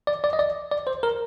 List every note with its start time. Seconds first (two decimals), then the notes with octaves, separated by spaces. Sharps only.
0.07 D5
0.24 D5
0.33 D#5
0.39 D5
0.72 D5
0.87 C5
1.03 A#4